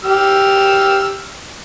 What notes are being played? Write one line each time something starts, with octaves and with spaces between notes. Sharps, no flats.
G4 E6 F6